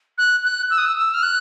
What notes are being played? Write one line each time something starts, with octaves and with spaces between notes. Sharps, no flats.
F#6
F#6
E6
D#6
E6
E6
F6
F#6